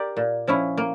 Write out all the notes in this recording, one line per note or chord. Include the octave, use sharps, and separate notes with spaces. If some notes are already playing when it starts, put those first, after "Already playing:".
Already playing: G4 A#4 D5
A#2
F3 C#4 E4
A#3